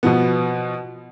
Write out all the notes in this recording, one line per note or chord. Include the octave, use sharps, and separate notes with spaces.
B2 F3 B3